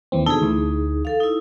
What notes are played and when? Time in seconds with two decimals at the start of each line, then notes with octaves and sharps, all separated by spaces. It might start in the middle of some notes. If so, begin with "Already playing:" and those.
0.12 D#2 E3 C4
0.26 B2 D3 D#4 G#4 A4
0.42 D2 E3
1.05 A4 F5
1.20 D#4 E4